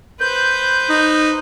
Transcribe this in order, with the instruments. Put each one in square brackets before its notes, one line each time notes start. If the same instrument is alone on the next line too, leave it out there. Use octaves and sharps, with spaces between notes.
[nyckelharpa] B4 C5 [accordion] G6
[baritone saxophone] D#4